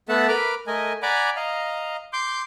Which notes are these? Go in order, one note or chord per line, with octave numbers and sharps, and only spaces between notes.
A3 B3 A4 E5 F#5 A5
A#4 B4 B5 D6 F6
A3 A#4 D#5 G#5
D5 F#5 G#5 A#5 B5 D6
D#5 F5 A#5
C6 D6 G6